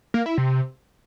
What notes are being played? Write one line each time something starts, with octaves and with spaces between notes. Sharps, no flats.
A#3
E4
C3